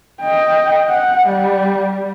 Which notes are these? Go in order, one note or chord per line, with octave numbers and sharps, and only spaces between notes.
D#5 G5
F#5
G3